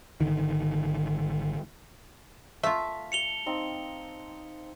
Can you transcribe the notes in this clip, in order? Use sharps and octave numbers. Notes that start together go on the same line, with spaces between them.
G#1 D#2 D3 D#3
A3 F4 E5 F5 A5
C#7 F7 G7
C4 D#4 F5